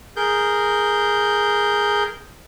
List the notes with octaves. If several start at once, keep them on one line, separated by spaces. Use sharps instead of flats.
G#4 A#4 G6